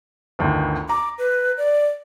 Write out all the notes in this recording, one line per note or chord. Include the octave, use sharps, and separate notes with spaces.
G1 D2 D#3
A#5 D6
B4
D5